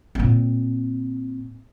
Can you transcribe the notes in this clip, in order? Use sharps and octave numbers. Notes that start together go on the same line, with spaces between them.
A#2 C4